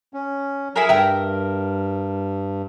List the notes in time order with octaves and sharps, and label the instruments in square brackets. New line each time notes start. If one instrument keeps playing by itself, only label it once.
[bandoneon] C#4
[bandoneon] F#3 [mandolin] E4 G#4 A#4
[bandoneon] G2 [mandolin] A#4 [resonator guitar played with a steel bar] E5 G5